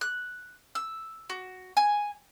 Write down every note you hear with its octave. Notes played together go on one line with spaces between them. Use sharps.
F#6
E6
F#4
G#5